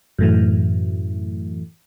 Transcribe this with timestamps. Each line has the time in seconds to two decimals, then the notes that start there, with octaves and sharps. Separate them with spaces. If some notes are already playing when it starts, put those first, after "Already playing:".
0.19 F#2 A2 E3